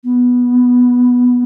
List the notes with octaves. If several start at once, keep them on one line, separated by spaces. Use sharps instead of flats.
B3